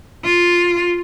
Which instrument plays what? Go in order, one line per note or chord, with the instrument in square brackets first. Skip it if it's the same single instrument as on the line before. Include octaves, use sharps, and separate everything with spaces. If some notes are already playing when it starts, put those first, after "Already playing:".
[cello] F4